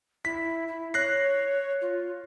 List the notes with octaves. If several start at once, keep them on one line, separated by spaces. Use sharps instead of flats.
E4 B6
E4
C#5 F#6 A#6 C7
F4